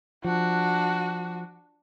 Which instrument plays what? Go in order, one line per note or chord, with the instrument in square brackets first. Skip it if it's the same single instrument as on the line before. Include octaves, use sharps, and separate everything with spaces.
[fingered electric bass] F3 [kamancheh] D4 F#4